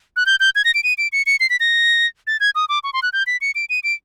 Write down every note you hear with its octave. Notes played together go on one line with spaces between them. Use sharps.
F#6
G6
G6
G#6
A#6
D7
D#7
D7
C#7
C#7
C7
B6
A#6
A6
G#6
D#6
D6
C#6
C6
F#6
G6
B6
C#7
D7
D#7
D7